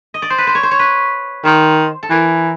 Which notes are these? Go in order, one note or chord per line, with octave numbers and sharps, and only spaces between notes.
D#5
D5
C5
B4
C5
C#5
C5
C#5
B4
D#3 C5
A4
E3 A#4